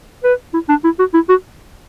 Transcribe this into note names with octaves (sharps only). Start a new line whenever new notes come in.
B4
E4
D4
E4
F#4
E4
F#4